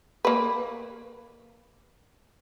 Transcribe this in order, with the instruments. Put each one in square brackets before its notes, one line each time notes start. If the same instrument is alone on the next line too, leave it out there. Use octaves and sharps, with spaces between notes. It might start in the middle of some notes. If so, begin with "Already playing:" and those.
[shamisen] A#3 B4